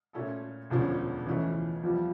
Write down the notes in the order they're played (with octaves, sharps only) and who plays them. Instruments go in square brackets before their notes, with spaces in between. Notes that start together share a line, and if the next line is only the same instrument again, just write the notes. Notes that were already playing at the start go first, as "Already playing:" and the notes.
[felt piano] A#2 A3 C#4 E4 A4
E1 D2 D3 F3 C#4
[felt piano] C#2 C#3 F3 A3 C#4 [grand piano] E3
[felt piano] E2 E3 G3 [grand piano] F3